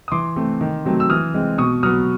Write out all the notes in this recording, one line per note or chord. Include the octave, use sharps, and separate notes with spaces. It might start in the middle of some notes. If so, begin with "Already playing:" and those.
D#6
E3 C6 D6
A3 C4
D#3
F#3 A3 C4
E6
E3 D#6 F6
G#3 C4
B2 C#6 D#6
F#3 B3 D#6 F6